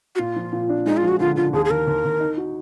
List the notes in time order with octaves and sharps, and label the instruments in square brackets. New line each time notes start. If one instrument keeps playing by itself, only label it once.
[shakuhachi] F#4
[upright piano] A#2 [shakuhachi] F4
[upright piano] F3
A#2
D4
[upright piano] G#3 [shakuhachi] D#4
[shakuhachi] F4
[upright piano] F3
[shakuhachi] F#4
[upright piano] D3 [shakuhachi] F4
[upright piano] D3 [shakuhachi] F4
[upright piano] D#2 [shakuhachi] G#4
[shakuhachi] G#4
[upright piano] D#2 [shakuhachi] A#4
[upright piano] D#2
D#2
D#4
F#4